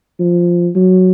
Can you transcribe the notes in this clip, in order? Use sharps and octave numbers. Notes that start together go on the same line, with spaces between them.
F3
F#3